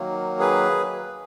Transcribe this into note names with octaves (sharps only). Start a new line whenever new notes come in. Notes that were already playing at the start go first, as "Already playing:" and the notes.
Already playing: D#3 F#3 A#3
G#4 B4